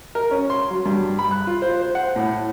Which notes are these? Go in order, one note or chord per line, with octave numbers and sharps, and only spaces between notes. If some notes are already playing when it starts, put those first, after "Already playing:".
A#4
C#4
C6
F#3
G2
B5
F#6
F4
C5
C5
F#5
A2